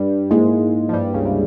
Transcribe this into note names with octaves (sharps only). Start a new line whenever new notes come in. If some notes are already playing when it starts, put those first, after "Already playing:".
Already playing: G2 G3
G#2 G#3 A#3 E4 G#4
F3
G2 G3
C#2 C#3
C3